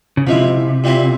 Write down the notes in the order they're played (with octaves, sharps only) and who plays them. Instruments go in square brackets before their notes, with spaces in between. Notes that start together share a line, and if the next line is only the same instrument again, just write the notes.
[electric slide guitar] C#3
[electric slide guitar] C3 [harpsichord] F3 G#3 E4
[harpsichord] A#2 G3 C4 E4